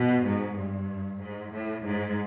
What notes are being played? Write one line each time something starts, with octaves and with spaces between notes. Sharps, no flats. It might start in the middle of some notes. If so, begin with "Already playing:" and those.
Already playing: B2
G#2
G2
G#2
A2
G#2